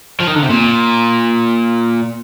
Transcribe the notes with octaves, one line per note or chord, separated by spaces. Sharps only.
F3
D#3
D3
C3
A#2